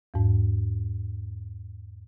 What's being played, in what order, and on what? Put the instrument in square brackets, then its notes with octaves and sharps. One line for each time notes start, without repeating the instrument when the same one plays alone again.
[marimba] E2 G#2